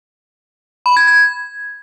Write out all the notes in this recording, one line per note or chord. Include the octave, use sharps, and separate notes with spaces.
B5
G#6
G#6